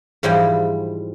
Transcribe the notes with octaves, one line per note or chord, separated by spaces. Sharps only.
G#2 E3 F3 G3 E4 G5